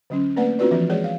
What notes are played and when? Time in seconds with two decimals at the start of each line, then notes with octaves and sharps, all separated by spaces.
0.10 D3 F#3 C#4
0.36 A3 A#3 C4 B4 D5 F#5
0.59 C4 D4 F4 F#4 B4 D5
0.71 E3 F3 C4 D4
0.90 G#3 G#4 C#5 D5
1.04 F5